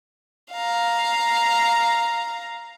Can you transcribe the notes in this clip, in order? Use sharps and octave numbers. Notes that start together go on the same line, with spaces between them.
F5 A#5